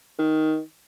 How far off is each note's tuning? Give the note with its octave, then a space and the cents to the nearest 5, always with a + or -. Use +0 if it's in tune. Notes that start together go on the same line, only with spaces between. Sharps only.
D#3 +10